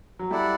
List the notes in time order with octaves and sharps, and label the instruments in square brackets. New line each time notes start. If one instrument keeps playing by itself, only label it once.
[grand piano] F#3
[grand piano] G3 [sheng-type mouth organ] E4 A4 D5 F#5